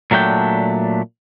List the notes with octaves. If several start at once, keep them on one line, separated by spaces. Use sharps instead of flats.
A#2 F#3 A3 D4 G5